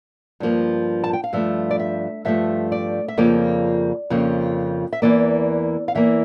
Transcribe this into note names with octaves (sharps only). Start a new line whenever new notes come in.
G2 F3 A#3
A5
G5
F5
G2 F3 A3 E5
D5
E5
G2 F3 A3 E5
D5
E5
F2 C#3 F3 A#3 D5
F2 C#3 F3 A#3
E5
E2 E3 A#3 D5
F5
E2 E3 A#3 E5